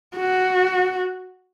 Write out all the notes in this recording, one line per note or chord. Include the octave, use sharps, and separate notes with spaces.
F#4